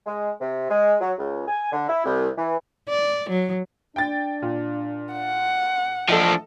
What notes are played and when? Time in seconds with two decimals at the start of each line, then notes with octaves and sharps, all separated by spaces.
0.06 G#3
0.40 C3
0.70 G#3
1.01 F#3
1.18 C#2
1.48 G#5
1.72 D3
1.89 E4
2.05 C2
2.37 E3
2.89 D5
3.30 F#3
3.96 D4 G5 A6
4.42 A#2
5.12 F#5
6.09 E3 F3 A3 D4 A4 D#5 A5